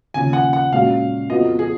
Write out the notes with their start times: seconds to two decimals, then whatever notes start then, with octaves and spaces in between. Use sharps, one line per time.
0.14 D#2 C#3 F3 G#5
0.33 F#5
0.53 F#5
0.72 A#2 G#3 C#4 F#4 F5
1.30 F2 F3 B3 F#4 D#5
1.59 G#4